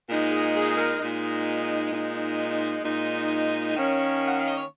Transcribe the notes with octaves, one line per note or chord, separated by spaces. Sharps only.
A#2 G#3 D#4
G#4
G#4
A#4
A#2 G#3 D#4
A#2 G#3 D#4
A#2 G#3 D#4
D#3 A#3 C#4
F#5
F5
D#5
C#5